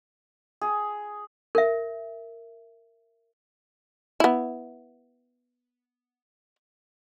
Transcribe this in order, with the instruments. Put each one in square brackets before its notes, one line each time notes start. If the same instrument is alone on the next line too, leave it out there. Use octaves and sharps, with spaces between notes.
[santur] G#4
[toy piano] A#4 E5
[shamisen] B3 E4